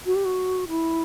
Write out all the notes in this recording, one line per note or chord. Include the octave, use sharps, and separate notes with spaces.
F#4
G4
F#4
E4